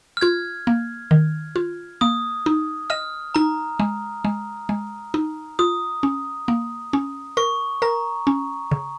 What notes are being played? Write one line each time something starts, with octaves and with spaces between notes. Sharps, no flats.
F6
F4 G#6
A#3
D#3
F4
A#3 D#6
D#4
D#5 F6
D#4 A#5
G#3
G#3
G#3
D#4
F4 D#6
C#4
A#3
C#4
A#4 C#6
A#4 A#5
C#4
C#3